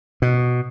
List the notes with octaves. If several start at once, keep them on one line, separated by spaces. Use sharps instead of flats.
B2